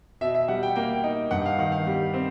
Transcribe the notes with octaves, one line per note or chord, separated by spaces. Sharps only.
B2 E5
E5
G3 F#5
G5
A#3 G5
D#4
G2 F#5
F5
D#3 F#5
F5
G3
C4